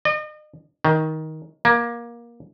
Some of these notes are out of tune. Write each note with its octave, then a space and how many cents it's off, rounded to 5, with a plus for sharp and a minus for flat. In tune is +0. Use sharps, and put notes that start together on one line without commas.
D#5 -40
D#3 +15
A#3 +20